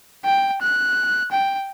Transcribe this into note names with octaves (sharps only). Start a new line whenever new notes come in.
G5
F#6
G5